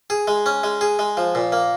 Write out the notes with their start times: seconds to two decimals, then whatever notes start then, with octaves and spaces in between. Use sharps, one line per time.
0.10 G#4
0.28 G#3
0.46 C#4
0.63 G#3
0.81 G#4
0.99 G#3
1.17 F3
1.35 A#2
1.52 A#3